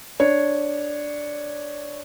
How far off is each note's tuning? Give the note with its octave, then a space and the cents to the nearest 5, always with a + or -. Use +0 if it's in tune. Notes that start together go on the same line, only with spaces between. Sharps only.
D4 +0 C#5 -5